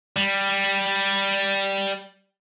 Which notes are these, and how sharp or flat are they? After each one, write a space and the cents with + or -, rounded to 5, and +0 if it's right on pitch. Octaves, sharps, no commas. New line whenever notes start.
G3 +0